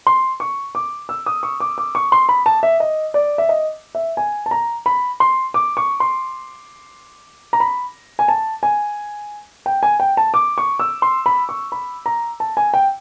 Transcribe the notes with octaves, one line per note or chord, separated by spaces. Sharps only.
C6
C#6
D6
E6
D#6
C#6
D6
D6
C#6
C6
B5
A5
E5
D#5
D5
E5
D#5
E5
G#5
A5
A#5
B5
C6
D6
C#6
C6
A#5
B5
G#5
A5
G#5
G5
G#5
G5
A5
D6
C#6
E6
C6
B5
C#6
B5
A#5
A5
G#5
G5